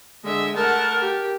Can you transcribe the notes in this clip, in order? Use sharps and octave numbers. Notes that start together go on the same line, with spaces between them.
D3 G#3 E5
A3 A#4 F#5 A5
G4